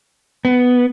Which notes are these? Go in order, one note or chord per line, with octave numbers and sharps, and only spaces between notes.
B3